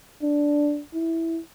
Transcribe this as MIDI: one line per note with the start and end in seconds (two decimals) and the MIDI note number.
0.22 0.81 62
0.94 1.40 64